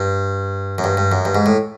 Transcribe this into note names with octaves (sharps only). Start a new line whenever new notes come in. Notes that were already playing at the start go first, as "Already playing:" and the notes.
Already playing: G2
F#2
G2
G2
F#2
G2
G#2
A2